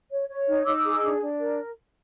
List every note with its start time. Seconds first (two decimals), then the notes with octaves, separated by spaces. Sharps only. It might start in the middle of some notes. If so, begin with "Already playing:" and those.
0.11 C#5
0.29 C#5
0.48 D#4
0.66 D#4 D6 E6
0.84 G#4
1.03 D4
1.20 D4
1.40 A#4